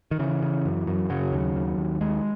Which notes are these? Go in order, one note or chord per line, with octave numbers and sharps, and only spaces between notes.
D#3
C#3 E3
C#3
F#2
F#2
C#3 F#3
D#2
D#2
D#2
D#2 G#3